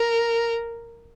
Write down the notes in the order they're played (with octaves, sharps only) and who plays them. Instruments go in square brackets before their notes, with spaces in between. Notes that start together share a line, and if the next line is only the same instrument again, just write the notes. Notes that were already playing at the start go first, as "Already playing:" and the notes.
Already playing: [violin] A#4